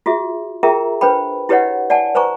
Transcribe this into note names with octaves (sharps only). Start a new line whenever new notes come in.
F4 F#4 G#4 E5
F4 G#4 A#4 E5 G5 A#5
D4 B4 C5 G5 B5
E4 G4 B4 C#5 D#5 F#5
D5 F#5 G#5 A5
B4 C5 G#5 A#5 C#6